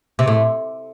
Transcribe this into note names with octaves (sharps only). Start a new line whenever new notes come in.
C3
A2